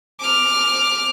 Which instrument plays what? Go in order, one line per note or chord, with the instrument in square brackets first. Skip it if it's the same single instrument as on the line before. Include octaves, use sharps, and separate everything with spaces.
[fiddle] D6 F6